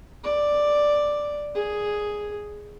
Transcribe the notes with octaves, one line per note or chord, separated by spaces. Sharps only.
D5
G#4